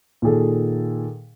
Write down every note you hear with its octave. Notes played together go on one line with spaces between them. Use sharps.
A#2 D#3 G#4 A4